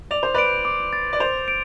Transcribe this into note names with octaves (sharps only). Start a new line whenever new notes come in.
D5 F7
C5
B4 D5 D7
D6
A6
D5
C5 F7
D7